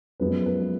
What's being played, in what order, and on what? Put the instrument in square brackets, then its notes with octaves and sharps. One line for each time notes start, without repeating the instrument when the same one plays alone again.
[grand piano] F#2 F3 G#3 B3 B4
B4